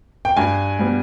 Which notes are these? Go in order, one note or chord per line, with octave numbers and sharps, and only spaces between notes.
G5
G2 G#5
G3 B3